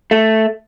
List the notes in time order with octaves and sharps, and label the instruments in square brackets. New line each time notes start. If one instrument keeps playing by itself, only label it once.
[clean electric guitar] A3